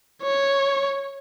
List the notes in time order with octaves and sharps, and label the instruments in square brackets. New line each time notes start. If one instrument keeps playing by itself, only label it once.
[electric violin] C#5